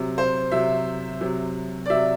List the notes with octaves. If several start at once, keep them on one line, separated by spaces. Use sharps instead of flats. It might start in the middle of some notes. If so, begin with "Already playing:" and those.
Already playing: C3 F#3
C5
C3 F#3 E5
C3 F#3
D5
C3 F#3 E5